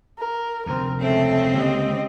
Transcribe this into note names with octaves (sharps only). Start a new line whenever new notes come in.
A#4
F1 D2 C4 A#4
C#3 G#3 A3 C4
C#2 D3 A#3 G4 D#5